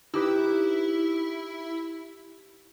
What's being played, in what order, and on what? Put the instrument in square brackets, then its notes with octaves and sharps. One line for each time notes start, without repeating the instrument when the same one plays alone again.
[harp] D#4 G4 B4 [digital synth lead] E4